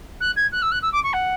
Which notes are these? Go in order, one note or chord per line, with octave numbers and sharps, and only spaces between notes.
F#6
G#6
F#6
E6
F#6
E6
D6
C#6
F#5